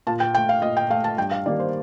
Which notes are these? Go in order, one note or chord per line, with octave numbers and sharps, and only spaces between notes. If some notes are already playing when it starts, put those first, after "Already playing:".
A#2 A5
G5
A3 G5
F5
A#2 D#5
G5
A3 F5
A5
G2 G5
F5
D#3 G3 A#3 D5
C5